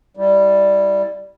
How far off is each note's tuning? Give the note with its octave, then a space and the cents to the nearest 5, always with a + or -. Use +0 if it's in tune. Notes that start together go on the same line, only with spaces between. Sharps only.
G3 +0 E4 -10